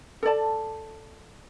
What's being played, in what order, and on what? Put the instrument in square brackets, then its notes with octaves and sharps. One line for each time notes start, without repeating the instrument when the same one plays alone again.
[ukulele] A4 D5 A5